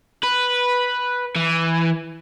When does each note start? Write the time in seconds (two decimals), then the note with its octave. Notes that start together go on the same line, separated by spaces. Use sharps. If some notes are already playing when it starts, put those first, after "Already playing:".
0.23 B4
1.36 E3